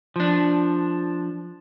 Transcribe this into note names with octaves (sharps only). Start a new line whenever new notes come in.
F3 D4